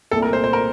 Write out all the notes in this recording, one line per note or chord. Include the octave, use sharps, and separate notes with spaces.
C2 A#2 A3 A4
A#4
C5
C5
A#4